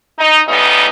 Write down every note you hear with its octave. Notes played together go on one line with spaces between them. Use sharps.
D#4
A2 C#3 G3 B3 D#4